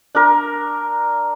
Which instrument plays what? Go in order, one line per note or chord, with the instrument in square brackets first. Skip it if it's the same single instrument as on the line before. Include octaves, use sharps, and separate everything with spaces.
[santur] D4 A#4